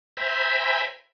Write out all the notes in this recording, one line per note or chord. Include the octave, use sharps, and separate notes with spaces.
C5 E5 G5 G#5 A#5 B5